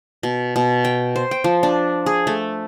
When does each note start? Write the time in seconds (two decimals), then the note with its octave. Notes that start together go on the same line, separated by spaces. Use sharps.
0.23 B2
0.56 B2
0.85 G5
1.16 C5
1.31 G5
1.44 F3
1.63 D4
2.06 G#4
2.27 A3